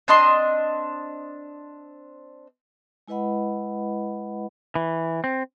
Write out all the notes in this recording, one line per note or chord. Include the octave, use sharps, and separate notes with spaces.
C4 D4 D#5 C6
G#3 E4 B4 D#5 F#5 B5
E3
C4